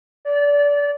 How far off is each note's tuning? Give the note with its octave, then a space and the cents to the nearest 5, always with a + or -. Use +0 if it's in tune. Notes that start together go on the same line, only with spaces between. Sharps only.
D5 -25